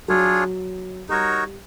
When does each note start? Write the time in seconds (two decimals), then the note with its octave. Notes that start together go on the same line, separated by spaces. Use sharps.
0.08 F#3 D4 F4 G#4 C#5
1.09 G3 D#4 F#4 A#4 C#5